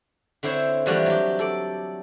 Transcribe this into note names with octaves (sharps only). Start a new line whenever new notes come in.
D3 C4 E4 C5 C#5
E3 F3 G3 A3 D4 F#4
F#3 G4
A4 D5